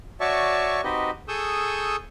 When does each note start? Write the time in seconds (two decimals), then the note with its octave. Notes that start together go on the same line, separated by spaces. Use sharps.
0.20 F#4 C#5 D5 E5 A5 C#6
0.84 C4 D#4 F#4 G4 B4 D#5
1.28 G#4 A4 C#6 D#6 E6 G6